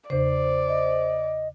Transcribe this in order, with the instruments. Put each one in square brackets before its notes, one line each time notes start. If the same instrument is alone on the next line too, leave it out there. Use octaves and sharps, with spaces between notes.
[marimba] E2 C#3 [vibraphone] C5 [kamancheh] D5
[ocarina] D#5